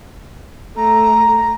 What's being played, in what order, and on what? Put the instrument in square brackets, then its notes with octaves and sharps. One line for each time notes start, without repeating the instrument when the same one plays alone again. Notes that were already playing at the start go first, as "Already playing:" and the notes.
[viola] A3 [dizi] A#5